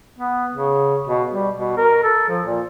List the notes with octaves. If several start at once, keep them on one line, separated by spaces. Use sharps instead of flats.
B3
C#3
B2
G3
B2
A#4
A4
F3
A#2